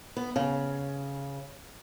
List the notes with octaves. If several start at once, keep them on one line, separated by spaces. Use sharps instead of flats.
B3
C#3